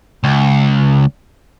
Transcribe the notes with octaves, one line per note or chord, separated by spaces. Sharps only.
C#2